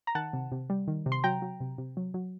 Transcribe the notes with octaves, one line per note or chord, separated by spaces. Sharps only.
A#5
D#3 F#5 A5
C3
C3
G3
D#3
C3
C6
F#3 G5 A#5
F#3
C3
C3
F#3
F#3